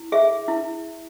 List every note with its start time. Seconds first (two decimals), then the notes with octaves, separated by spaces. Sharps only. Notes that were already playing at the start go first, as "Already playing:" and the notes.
Already playing: E4
0.12 G#4 E5
0.48 E4